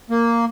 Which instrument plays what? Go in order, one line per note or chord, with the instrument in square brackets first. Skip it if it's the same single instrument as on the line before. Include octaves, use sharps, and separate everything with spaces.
[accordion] A#3